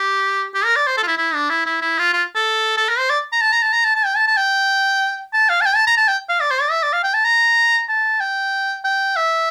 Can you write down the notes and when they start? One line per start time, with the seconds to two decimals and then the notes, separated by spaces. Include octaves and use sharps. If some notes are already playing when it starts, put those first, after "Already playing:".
Already playing: G4
0.54 G4
0.65 A#4
0.76 D5
0.87 C5
0.97 A4
1.03 F4
1.07 E4
1.18 E4
1.34 D4
1.50 E4
1.66 E4
1.82 E4
1.99 F4
2.13 F4
2.36 A4
2.77 A4
2.89 A#4
2.99 C5
3.10 D5
3.32 A#5
3.42 A5
3.53 A#5
3.62 A5
3.73 A#5
3.85 A5
3.96 A5
4.05 G5
4.16 A5
4.27 A5
4.37 G5
5.33 A5
5.49 F5
5.61 A5
5.66 G5
5.76 A5
5.87 A#5
5.97 A5
6.08 G5
6.29 F5
6.40 D5
6.51 C5
6.61 D5
6.71 E5
6.83 D5
6.93 F5
7.04 G5
7.14 A5
7.25 A#5
7.89 A5
8.20 G5
8.84 G5
9.16 E5